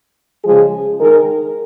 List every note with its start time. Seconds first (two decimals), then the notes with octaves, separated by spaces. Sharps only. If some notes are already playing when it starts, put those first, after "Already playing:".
0.45 C#3 F3 G#3 G#4
1.00 D#3 G#3 A#4